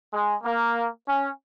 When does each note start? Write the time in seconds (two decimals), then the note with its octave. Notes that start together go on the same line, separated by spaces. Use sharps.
0.12 G#3
0.44 A#3
1.07 C#4